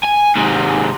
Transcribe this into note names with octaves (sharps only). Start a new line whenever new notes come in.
G#5
G#2 C3